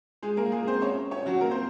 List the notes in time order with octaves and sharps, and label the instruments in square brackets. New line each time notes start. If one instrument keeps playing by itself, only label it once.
[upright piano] G#3 G#4
A#3 A#4
G#3 G#4
C4 C5
C#4 C#5
C#4 C#5
F#3 F#4
A#3 A#4
C4 C5